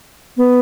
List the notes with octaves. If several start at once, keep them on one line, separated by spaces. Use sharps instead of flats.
B3